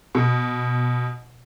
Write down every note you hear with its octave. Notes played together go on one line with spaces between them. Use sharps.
B2